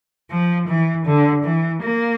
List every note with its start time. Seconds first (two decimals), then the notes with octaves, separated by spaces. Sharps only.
0.31 F3
0.68 E3
1.06 D3
1.44 E3
1.82 A#3